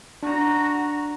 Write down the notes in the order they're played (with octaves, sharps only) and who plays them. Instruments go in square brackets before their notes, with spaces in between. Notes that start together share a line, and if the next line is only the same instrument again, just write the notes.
[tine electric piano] D4 [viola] F#4 A#5